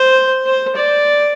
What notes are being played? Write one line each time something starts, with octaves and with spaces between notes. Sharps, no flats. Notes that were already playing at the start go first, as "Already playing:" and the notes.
Already playing: C5
C5
D5